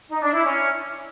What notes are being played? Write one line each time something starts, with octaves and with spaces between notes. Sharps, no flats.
D#4
D4
E4
C#4